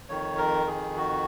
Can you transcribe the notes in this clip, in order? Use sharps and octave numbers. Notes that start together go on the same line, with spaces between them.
F2 D#3 C#5
A#4
G#4
F#4